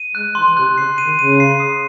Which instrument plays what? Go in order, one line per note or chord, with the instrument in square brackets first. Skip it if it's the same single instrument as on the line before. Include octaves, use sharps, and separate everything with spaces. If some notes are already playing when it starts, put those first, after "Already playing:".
Already playing: [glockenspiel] D#7
[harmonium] G#3 [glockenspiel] F#6
[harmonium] E3 [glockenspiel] C6
[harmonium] C3 [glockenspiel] F#6
[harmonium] C#3 [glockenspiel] C7
[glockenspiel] D#7
[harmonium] D#3
[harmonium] C#3 [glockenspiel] D#7
[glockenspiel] C7
D#6